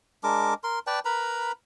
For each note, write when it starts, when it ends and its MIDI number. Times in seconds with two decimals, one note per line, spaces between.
0.24 0.54 56
0.24 0.54 62
0.24 0.54 70
0.24 0.54 86
0.64 0.79 70
0.64 0.79 84
0.87 0.99 71
0.87 0.99 74
0.87 0.99 79
0.87 0.99 81
1.05 1.52 70
1.05 1.52 71
1.05 1.52 82
1.05 1.52 83